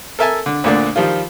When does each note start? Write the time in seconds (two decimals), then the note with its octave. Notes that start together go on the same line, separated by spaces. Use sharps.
0.19 A4 A#4 E5 G#5 A5
0.46 D3
0.64 D2 A#2 D3 A3 A#3 D4
0.96 D#3 F3 G3 F4